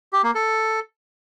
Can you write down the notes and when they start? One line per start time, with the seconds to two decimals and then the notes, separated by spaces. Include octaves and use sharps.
0.13 G4
0.24 A#3
0.35 A4